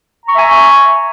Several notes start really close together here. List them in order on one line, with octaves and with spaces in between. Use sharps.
A#5 C#6 E5 G#5